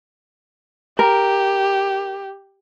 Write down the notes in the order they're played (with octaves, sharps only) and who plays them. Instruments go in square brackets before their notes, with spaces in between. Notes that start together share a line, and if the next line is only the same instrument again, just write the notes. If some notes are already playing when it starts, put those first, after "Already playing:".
[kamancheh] G4 [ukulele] A#4